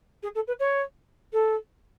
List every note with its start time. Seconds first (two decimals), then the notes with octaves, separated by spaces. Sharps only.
0.23 G#4
0.35 A4
0.47 B4
0.59 C#5
1.33 A4